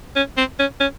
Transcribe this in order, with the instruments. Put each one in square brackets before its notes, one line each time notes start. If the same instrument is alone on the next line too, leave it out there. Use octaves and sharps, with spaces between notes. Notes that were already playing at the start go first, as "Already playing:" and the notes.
[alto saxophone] C#4
C4
C#4
C#4